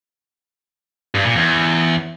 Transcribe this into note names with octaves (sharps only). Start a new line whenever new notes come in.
G2
A#2
E2